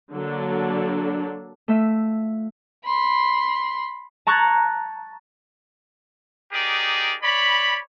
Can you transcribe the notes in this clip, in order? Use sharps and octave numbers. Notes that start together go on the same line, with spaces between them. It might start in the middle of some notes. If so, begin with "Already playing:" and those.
D3 F#3 A#3 D4 A4
A3 F4 E5
B5 C6
A5 A#5 C#6 F#6 G#6 A6
D#4 G4 G#4 A#4 D5
C#5 D5 B5